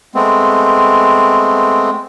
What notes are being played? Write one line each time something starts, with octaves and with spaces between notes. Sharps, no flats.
G#3 A3 B3 C4